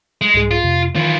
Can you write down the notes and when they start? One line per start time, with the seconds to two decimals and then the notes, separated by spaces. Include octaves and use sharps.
0.22 G#3
0.34 C2 G#2 G#4
0.51 F4
0.64 F2 C3
0.96 D#3 E3 F4